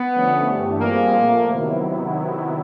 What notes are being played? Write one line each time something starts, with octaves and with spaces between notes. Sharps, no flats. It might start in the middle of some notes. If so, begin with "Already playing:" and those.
Already playing: B3
D3 F3 A3 C#4
G2 E3 A3 D4 G4
G3 A#3 C4 F4 G#4
A#2 F3 A3
C3 D#3 F#3 B3 E4